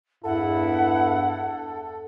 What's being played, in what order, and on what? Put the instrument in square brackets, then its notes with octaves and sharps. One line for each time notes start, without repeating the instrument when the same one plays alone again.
[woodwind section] E2 G2 [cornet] E4 [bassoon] A4 [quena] F#5